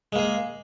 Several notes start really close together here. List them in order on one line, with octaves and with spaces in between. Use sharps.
G#3 A#3 G#4